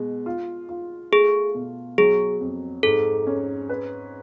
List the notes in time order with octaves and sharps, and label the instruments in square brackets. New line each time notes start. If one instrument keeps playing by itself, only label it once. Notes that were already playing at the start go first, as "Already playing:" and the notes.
Already playing: [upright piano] B2 G#3
F4
F4
[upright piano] A3 [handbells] G#4
[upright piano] B2
[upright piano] F#3 [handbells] G#4
[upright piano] F2
[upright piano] G#2 [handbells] A4
[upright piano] C#4
B4